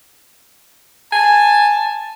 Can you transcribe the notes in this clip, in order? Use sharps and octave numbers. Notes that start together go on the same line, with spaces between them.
G#5 A5